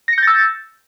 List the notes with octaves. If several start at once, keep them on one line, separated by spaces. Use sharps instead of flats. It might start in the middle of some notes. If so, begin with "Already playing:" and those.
E6 G6 A6 A#6 C#7